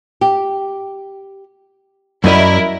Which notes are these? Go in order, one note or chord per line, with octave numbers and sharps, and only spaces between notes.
G4
F#2 E4 F#4 A#4 D5 D#5